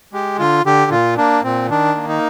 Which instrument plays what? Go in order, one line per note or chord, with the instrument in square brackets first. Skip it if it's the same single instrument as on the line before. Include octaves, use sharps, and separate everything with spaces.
[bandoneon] G#3 G4
D3 F4
D3 G4
A#2 F4
A#3 D4
A#2 C4
D#3 D4
A#3
D#4